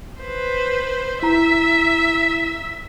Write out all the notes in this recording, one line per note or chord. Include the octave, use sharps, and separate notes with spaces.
B4 C5
E4 E5 A#5